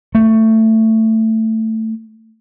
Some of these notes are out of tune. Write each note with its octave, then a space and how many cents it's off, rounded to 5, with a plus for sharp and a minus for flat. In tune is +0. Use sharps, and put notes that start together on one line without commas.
A3 +15